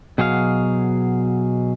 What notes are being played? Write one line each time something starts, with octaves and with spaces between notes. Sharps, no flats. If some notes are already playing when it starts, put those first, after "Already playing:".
B2 F#3 G#4 C5 F5